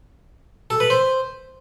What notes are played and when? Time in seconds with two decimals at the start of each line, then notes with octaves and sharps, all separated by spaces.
0.70 A4
0.80 B4
0.90 C5